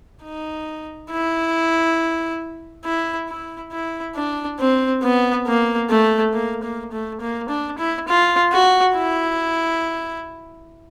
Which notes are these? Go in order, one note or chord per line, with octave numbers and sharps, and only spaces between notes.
D#4
E4
E4
E4
E4
D4
C4
B3
A#3
A3
A#3
A#3
A3
A#3
D4
E4
F4
F#4
E4